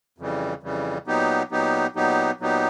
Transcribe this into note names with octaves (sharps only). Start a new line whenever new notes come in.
F2 C#3 E3 G3
F2 C#3 E3 G3
A#2 F#3 B3 D#4 G4
A#2 F#3 B3 D#4 G4
A#2 F#3 B3 D#4 G4
A#2 F#3 B3 D#4 G4